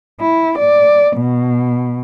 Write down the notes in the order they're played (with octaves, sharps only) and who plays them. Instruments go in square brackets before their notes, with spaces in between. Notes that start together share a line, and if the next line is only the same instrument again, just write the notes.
[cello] E4
D5
B2